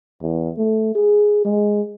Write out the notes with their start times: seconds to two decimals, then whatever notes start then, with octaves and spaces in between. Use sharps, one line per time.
0.22 E2
0.58 A3
0.95 G#4
1.45 G#3